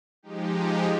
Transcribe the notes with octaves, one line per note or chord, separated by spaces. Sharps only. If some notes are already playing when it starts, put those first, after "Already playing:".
F3 G#3 D#4 G4